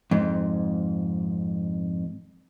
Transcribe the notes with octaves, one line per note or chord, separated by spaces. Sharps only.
F2 G#2